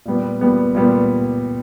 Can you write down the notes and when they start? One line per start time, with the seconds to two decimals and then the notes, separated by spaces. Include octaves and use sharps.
0.06 A#2 G3 B3
0.41 A#2 G3 B3
0.75 A#2 G3 B3